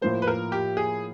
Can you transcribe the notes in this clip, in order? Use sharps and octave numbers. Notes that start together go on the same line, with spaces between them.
A2 F3 A#3 C5
B4
A#4
G4
G#4